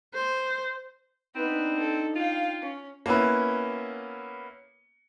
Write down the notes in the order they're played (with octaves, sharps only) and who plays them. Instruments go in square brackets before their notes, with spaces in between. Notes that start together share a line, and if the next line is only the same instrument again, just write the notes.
[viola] C5
[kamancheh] B3 B4 [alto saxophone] C4 [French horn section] D4 D#4
[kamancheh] A4
[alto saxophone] F4 [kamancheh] F5 G5
[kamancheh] C#4
[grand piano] A#3 B3 C#4 E4 B4